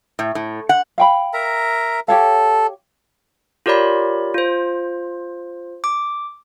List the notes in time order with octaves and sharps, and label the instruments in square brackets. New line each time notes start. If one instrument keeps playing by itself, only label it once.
[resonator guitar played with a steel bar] A2
A2
F#5
[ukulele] F5 G5 B5
[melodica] A#4 E5 A#5
[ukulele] G4 C#5 F5 [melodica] A4
[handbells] F4 G4 A#4 C#5 D5 B5
F4 C5
D6